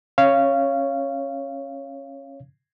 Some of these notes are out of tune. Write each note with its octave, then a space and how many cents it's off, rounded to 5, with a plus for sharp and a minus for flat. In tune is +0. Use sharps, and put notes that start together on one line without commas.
C#4 -25 C#5 +0 F5 -20